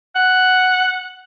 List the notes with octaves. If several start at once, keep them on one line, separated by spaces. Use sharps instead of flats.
F#5